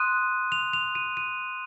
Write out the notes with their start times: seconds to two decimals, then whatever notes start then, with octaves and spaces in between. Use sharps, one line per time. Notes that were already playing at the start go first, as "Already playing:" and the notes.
Already playing: C6 D#6 F#6 D#7
0.52 F7
0.73 F7
0.95 D#7
1.17 D#7